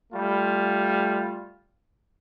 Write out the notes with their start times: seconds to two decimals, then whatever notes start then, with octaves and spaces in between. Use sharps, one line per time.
0.12 G3 A3 F4